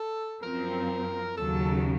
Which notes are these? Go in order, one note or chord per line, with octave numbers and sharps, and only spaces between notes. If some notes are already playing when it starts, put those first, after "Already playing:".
Already playing: A4
F#2 F3 C4 A#4
D#2 C#3 F#3 A4